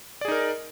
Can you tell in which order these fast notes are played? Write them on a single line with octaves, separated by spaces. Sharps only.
D5 G#4 D#4 A#4